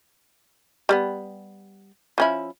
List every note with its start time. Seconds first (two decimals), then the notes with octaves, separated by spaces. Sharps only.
0.89 G3 G#3 B3
2.18 F3 C#4 E4